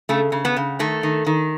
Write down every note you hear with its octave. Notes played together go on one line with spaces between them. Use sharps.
C#3 A3
C#3
B3
C#3
D#3 A3
D#3
D#3